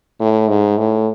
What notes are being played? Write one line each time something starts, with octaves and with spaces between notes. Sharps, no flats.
A2
G#2
A2